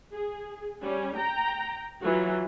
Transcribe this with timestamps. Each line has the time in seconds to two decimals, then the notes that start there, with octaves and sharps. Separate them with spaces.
0.13 G#4
0.82 G3 C#4
1.17 G5 A#5
2.02 E3 F#3 F4 F#4